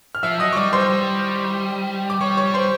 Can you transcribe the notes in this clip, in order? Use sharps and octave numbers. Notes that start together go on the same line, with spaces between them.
F6
F3 E5 E6
F#3 D#5 D#6
C#6
G3 D5 D6
G3 C5 C6
G3
D6
G3 C#5 C#6
C#5 C#6
G3
C5 C6